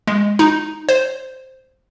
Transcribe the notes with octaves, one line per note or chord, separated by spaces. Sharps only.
G#3
D#4
C5